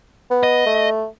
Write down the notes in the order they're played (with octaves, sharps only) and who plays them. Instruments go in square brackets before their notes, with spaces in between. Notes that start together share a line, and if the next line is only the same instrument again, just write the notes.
[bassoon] B3
[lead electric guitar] D#5
[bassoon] A3